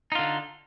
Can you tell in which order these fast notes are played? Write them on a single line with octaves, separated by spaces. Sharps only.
D#4 F4 D3